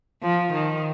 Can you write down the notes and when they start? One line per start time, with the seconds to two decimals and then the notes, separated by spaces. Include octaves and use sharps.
0.22 F3
0.52 D#3